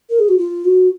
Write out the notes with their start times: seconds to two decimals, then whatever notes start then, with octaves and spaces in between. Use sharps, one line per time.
0.09 A#4
0.19 G#4
0.28 F#4
0.38 F4
0.65 F#4